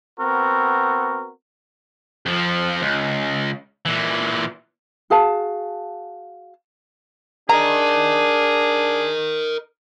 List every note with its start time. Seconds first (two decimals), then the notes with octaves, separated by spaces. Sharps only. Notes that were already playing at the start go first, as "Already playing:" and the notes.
0.20 B3 C4 F#4 A#4
2.26 F2 F3
2.82 C#2
3.85 A#2 E3
5.10 F#4 G#4 F5 A5
7.49 D4 G#4 A#4 D#5 A#5